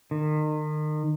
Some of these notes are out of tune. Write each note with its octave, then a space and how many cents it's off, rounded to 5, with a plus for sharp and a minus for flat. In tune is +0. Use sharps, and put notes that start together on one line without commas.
D#3 -35